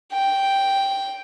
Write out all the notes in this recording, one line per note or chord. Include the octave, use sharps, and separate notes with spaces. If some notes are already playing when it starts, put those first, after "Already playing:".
G5